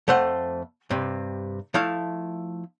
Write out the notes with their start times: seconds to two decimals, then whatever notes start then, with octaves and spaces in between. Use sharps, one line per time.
0.08 F2 A3 C5 F#5
0.90 G2 C3
1.74 F3 A3 E4 F5